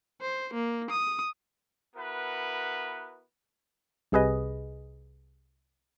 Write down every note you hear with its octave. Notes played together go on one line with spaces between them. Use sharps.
C5
A#3
D#6
B3 E4 F#4 A#4 B4
C2 C3 G#4 B4 D#5